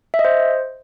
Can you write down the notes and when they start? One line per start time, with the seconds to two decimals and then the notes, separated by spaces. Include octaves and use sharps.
0.14 E5
0.19 D#5
0.25 C5